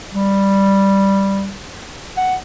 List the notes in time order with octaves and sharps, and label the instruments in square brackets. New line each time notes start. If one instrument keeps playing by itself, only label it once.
[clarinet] G3
F#5